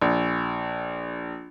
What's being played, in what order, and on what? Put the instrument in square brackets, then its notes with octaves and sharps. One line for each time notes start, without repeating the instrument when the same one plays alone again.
[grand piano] A#1